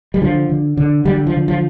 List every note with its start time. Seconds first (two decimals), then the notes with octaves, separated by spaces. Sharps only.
0.14 G3
0.22 D3 F3
0.50 D3
0.77 D3
1.05 D3 G3
1.27 F3
1.34 D3
1.48 F3